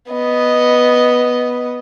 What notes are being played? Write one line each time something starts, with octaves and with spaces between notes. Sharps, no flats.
B3 D#5